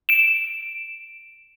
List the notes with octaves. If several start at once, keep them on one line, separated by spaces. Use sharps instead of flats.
D7 E7